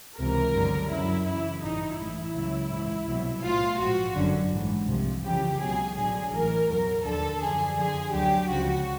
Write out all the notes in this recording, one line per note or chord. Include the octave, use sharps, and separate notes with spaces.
C#2 C3 E3 A#4
G1 G2 D3 F#3
F#2 C#3 F#3 E4
F#2 C#3 E3 E4
A1 G2 E3 D#4
A1 A2 E3 E4
C#2 C#3 F#3
A#1 G#2 E3
C2 B2 F#3
B1 A2 F3 F4
A#1 G#2 F3 F#4
G1 F#2 D3 F#3
A1 G#2 E3
C2 C3 F3
F2 C#3 E3 G4
C#2 B2 F#3 G#4
A1 G2 D3 F#3 G#4
A1 A2 E3 A#4
E2 B2 F#3 A#4
D#2 D3 F3 A4
F#2 D3 F3 G#4
F2 D3 F3 G#4
D2 D3 F#3 G4
C#2 C#3 F3 F#4